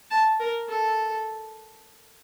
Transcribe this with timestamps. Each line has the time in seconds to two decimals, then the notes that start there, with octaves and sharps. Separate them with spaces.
0.11 A5
0.40 A#4
0.69 A4